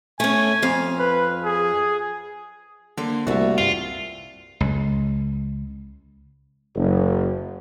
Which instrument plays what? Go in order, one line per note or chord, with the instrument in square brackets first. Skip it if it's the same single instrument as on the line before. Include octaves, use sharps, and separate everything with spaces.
[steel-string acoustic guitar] A3 C#4 [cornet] G#5
[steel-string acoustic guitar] F2 F5
[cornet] B4
G#4
[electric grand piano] D3 [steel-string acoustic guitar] A#3 C5
[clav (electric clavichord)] C2 [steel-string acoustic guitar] A3 A#3 [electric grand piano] F#4 E5
[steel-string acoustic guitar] G2 [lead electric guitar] F4
[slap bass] C#2
[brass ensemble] F#1